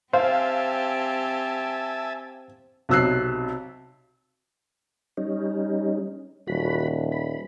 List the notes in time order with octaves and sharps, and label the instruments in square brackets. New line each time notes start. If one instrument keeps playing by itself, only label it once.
[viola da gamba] C4 G4 [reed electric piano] C5 [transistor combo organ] E5 G#5 A5 [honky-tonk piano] F5
[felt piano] B1 C3 E6 F#6 C7
[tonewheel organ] G3 C#4 D#4
[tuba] D#1 [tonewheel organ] F#4 B5
[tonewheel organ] B5